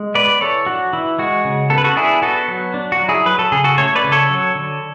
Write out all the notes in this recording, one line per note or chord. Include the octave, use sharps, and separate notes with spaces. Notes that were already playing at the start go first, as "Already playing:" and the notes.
Already playing: G#3
B3 B4 D5
E3 A4 C#5
D4 F#4
E3 E4
G#3 F#4
C#3
B3 A4
B4
F#4 A4
D4 E4 G#4
B3 F#4 A4
F#3
D4
F#4
F#3
E4 G#4
F#3 B4
A4
C#3 G#4
F#4 A4
A3 A4 C#5
B4 D5
C#3
A4 C#5
F#3
D3